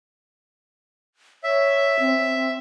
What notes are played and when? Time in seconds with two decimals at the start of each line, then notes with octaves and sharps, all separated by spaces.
1.44 C#5 E5
2.00 C4